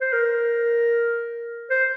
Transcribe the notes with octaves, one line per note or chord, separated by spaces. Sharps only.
C5
A#4
C5